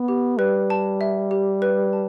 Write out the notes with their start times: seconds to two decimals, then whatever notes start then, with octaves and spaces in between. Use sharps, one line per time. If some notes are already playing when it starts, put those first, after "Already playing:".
Already playing: B3
0.08 G4
0.39 G3 B4
0.70 A5
1.01 E5
1.31 G4
1.62 B4
1.93 A5